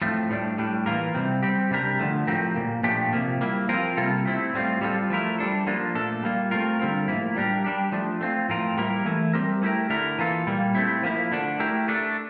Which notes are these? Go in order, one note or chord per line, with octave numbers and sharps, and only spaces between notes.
A2 F3 A3 C4
A2 G3 D4
A2 G3 D4
E3 A#3 F4 A#4
C3 G3 C4
G3 C4 G4
C3 G3 D4 G4 A#4
D3 F3 A3
A2 F3 C4 G4 A#4
A#2 F3 A#3
A#2 F3 A3 D4 G4
C3 F3 A#3
G3 A#3 E4
F3 C4 F4 A#4
C3 G3 A#3 F4 A4
A3 C4 E4
A2 G3 C4 F4
G3 C4 F4 A4
F3 A3 E4 A#4
G3 D4 A4
F3 A#3 D4 F4
A#2 A3 D4 A4
G3 A#3 F4
A3 C4 F4 A#4
D3 G3 C4 F4 A#4
A2 F3 A#3 E4
G3 D4 G4 A#4
G3 D4 G4
F3 A3 D4
A3 C4 F4
A2 F3 C4 F4 A#4
G3 A#3 E4 A#4
E3 A3 E4
G3 C4 G4 A#4
A3 E4 G4 A#4
D3 A3 E4 A#4
E3 A#3 F4 A4
A#2 G3 A#3
A3 C4 E4
F3 A#3 E4
D3 A3 D4
A3 E4 G4 A#4
A3 D4 A4